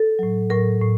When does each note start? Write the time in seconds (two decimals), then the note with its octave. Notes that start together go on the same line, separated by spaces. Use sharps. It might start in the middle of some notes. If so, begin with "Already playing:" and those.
Already playing: A4
0.19 A2 F#3
0.50 A2 F#3 A#4
0.81 A2